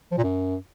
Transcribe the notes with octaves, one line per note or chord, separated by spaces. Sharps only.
F3
A#2
F#2